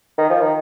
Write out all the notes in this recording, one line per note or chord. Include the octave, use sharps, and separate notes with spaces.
D#3
F3
D#3